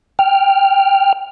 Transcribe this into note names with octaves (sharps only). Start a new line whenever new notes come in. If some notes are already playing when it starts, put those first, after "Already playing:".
G5 F6